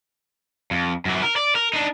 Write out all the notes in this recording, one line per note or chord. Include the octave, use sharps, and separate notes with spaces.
F2
F#2 E3
A#4
D5
A#4
D4 D#4